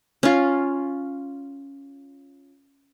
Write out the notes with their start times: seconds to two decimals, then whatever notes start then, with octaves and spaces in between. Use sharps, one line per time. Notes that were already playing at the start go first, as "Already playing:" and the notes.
0.23 C#4 F4